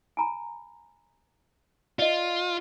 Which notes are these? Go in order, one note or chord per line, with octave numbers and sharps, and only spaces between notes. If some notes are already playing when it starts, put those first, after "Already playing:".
G#5 A#5 B5
F4 D5 D#5